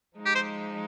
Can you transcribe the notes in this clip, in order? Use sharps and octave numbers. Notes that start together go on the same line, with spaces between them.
F3 G#3 D#4
G4
C5